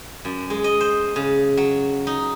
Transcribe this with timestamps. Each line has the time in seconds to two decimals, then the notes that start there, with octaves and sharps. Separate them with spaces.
0.25 F#2
0.50 G#3
0.64 D#5
0.81 C5
1.16 C#3
1.57 F#3
2.07 D#4